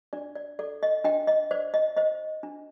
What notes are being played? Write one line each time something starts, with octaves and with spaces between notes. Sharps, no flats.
D4 D5
D5
A4 D5
D#5
D4 D#5 G5
D#5
C5 D5
D#5
C5 D#5
D4